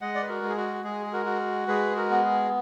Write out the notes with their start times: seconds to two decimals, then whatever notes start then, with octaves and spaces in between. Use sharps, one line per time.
0.01 G#3 D#5 F#5
0.15 D5
0.22 B4
0.28 F#4 A#4
0.43 G#3
0.49 G#4
0.57 F#4
0.84 G#3 G#4
1.06 G#4
1.13 F#4 A#4
1.26 F#4
1.68 G#3 G#4 B4
1.95 F#4 A#4
2.10 B3
2.25 G#4